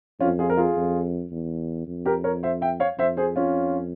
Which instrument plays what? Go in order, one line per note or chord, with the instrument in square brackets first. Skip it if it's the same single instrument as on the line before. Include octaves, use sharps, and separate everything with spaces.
[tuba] F2 [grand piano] C#4 F4
[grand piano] F4 G#4
A#4
F4 G#4
[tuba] F2
E2
F2
[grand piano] G4 A#4
A#4 C#5
C5 E5
E5 G5
C#5 F5
[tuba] F2 [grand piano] C5 E5
[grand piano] G#4 C5
C#4 F4